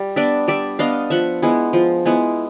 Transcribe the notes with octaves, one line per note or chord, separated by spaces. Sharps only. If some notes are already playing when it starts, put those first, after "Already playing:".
Already playing: G3
B3 D4 D5 E5
G3 D5 E5
B3 D4 D#5 F5
F3 E5 F#5
G#3 B3 E4
F3
G#3 B3 E4